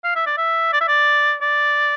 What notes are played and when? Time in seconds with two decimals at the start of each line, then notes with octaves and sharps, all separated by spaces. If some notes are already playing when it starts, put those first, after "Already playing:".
0.04 F5
0.15 E5
0.26 D5
0.37 E5
0.73 D5
0.81 E5
0.88 D5
1.41 D5